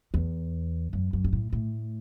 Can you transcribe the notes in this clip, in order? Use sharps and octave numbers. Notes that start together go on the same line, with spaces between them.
E2
F#2
F#2
G2
A2
A2